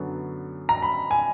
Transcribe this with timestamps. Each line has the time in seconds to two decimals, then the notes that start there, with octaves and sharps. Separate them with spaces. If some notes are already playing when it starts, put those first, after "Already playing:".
Already playing: F#2 D3 F#3 B3
0.69 A#5
0.82 B5
1.11 G#5